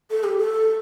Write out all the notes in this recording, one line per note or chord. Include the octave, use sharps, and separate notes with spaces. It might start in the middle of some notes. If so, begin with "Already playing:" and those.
A4
G4
A4